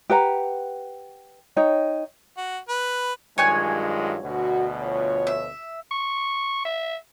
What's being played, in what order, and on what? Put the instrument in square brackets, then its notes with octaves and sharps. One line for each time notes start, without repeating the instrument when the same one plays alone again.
[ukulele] G4 B4 F#5 A#5
D#4 C#5 G5
[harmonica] F#4
B4
[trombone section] G2 D#3 G#3 [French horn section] F#3 F4 [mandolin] C#5 G#5 F#6
[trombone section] D2 B2 [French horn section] F#4
[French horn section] F3 F4 C#5
[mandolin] E5
[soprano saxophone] C#6
E5